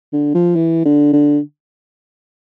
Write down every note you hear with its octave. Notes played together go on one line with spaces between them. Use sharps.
D3
F3
E3
D3
D3